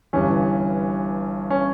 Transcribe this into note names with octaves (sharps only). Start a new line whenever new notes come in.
G1 G2 E3 C#4
C#4